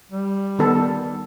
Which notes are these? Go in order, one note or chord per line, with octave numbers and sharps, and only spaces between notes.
G3
D#3 B3 A4